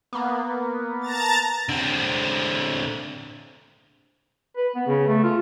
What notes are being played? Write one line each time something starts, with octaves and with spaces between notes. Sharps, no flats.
A#3 B3
A5 A#5 A6
D3 C4
B4
B3
C#3
A3
F4